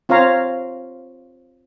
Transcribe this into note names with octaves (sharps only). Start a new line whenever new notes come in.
C4 F4 C#5 F5 A#5